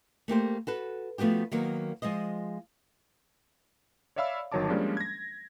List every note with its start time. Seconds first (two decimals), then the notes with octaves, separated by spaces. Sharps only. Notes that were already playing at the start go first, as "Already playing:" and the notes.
0.28 A3 A#3 G4 C5
0.67 F#4 A4 B4
1.18 F3 A3 B3 F#4 G4
1.51 D#3 F#3 A#3 B3
2.02 F3 G#3 F4 C5 D#5
4.16 C#5 D5 E5 F5 B5 E6
4.52 G1 D#3 F#3 C#5 A5 D6
4.69 F3 G3 G#3 A#3 C#4 D4
4.97 G#6 A#6